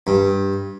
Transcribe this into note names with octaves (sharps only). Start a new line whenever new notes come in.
G2